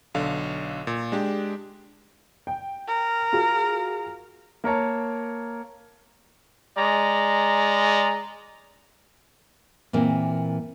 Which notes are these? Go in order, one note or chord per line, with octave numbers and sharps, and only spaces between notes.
B1 D3 F5
A#2
G#3 D4 G4
G5
A#4
F4 F#4 G#4
A#3 A#4 C#5 A5
G#3 D5 A#5
A#2 E3 A#3 C4